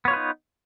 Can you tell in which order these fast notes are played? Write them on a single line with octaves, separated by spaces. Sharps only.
B3 C#5 F4 B4 D#4